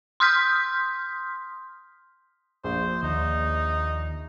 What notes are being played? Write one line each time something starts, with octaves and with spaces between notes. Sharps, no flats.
C6 D#6 F6 G6 B6
A#1 C5
D#2 D#4